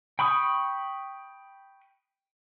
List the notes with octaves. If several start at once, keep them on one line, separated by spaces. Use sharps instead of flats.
G5 B5 C#6 D#6